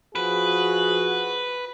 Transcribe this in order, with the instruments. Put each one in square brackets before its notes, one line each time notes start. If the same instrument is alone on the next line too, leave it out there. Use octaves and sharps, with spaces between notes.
[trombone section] F3 F#4 G#4 [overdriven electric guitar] B4